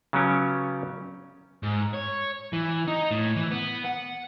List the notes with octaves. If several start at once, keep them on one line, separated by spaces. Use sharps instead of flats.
C#3 F#3 B3 C#4 G4
G#2
C#5
E3
D#4
A2
E3
B3
F#5